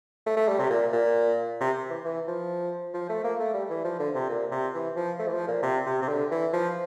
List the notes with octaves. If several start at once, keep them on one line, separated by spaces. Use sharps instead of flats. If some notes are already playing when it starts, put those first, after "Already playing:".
A3
A3
G3
C3
A#2
A#2
C3
E3
E3
F3
F3
A3
A#3
A3
G3
E3
F3
D3
C3
A#2
C3
E3
F3
A3
E3
F3
A#2
C3
C3
C3
D3
E3
F3